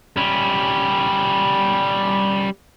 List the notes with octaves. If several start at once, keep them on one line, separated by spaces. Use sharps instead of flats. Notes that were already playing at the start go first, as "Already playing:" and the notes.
G3 C#4